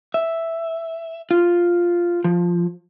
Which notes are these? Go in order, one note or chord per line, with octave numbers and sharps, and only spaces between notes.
E5
F4
F3